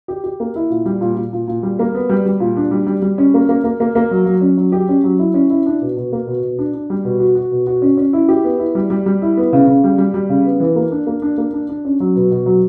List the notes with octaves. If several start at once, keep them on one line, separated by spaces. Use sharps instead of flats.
G4
G4
A#3
E4
A#2
G3
A#2
A#2
A#2
A#2
G3
A#3
B3
G3
G3
A#2
D4
G3
G3
G3
C#4
A#3
A#3
A#3
A#3
A#3
F#3
F#3
C#4
F#3
G4
C#4
F#3
E4
C#4
E4
D4
B2
B2
A#3
B2
B2
D4
D4
G3
B2
F#4
F#4
B2
F#4
C#4
C#4
E4
G4
B3
E4
G3
G3
G3
E4
B3
C#3
C#3
G3
G3
G3
C#3
B3
E3
A#3
D4
A#3
D4
A#3
D4
D4
C#4
F#3
B2
B2
F#3